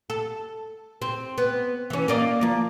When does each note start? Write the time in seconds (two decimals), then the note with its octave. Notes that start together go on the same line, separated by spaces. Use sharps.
0.10 A4
1.02 C4
1.38 B3
1.90 E3 C#4
2.08 A#3 D5 D#5
2.41 F3 A#3